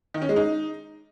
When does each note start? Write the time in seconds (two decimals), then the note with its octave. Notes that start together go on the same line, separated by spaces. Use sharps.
0.14 D#3
0.22 C#4
0.29 G#3
0.36 D#4